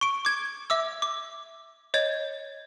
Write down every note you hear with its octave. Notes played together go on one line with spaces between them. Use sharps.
C#6 D7
D6 G#6
E5 D6 E6
D6
C#5 D#5 G#6